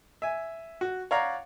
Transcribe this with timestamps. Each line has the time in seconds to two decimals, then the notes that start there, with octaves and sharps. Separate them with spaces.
0.22 E5 G#5
0.81 F#4
1.11 C#5 D5 F5 F#5 A#5